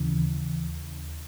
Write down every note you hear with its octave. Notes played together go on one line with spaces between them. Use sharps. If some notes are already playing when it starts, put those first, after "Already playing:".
Already playing: D#2 C#3 E3